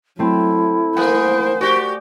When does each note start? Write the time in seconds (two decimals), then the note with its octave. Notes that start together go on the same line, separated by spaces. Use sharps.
0.19 F#3 A3 C4 E4
0.97 A#3 C5 F#5 G#5 D#6
1.61 F#4 G4 D5